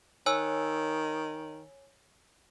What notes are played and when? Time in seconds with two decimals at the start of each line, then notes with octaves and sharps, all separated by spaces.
0.26 D#3 C#5 G#5 E6